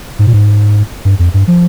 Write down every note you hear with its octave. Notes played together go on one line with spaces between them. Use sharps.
G#2
A#2
G#2
G2
F2
G2
F3